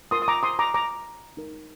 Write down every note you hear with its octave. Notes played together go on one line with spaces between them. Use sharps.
F4 A#4 C6 D#6
D#6
A#5 D6
C6 D#6
A#5 D6
A#5 D6
D#4 A#4